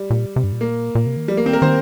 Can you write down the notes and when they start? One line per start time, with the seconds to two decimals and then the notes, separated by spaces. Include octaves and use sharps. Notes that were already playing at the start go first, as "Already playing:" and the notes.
Already playing: G3
0.10 A#2
0.36 C3
0.44 G2
0.52 A#2
0.61 A#3
0.95 A#2
1.06 C3
1.17 D#3
1.28 F3 G3
1.37 A#3
1.46 D#3 C4
1.53 A#4
1.62 D#3 C5